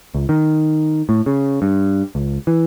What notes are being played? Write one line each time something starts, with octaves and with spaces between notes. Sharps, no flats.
C#2
D#3
A2
C#3
G2
C#2
E3